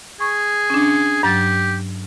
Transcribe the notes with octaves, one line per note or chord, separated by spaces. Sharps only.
G#4 C#6
C#4 D4
G2 F#3 G4 A6